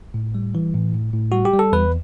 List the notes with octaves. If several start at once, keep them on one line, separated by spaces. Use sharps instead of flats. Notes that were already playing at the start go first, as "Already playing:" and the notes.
A2
G3
E3
A2
A2
A2
G3 F#4
G4
G3
A4
E2 B4